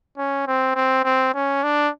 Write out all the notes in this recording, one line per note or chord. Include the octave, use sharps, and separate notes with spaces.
C#4
C4
C4
C4
C#4
D4